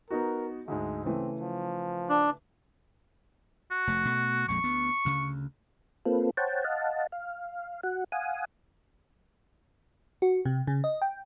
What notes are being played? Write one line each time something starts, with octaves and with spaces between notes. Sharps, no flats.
B3 D#4 F#4 A#4
D2 G#2 G#3
C#3 E3 A3 C4
F3
D4
F#4
F1 A3
B2 A3
A#1 F2 G#3 C#6
D2 B3
D2 C#3
A#3 C4 F4 A4 B4
C5 C#5 F#5 G5 A5
D#5 F5 F#5 A5
F5
F#4 F#5
F5 F#5 G#5 D#6
F#4
C3
C#3
D#5
G5